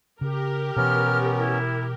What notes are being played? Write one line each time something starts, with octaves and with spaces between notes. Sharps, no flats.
C#3 G4 A#4
B2 E3 B3 C#4 F6
E4